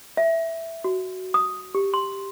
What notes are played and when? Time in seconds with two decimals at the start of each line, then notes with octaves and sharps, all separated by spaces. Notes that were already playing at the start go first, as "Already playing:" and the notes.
0.17 E5
0.84 F#4
1.34 D#6
1.75 G4
1.94 C6